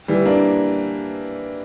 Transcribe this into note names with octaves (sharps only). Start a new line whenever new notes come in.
E3 G3
A#3 D4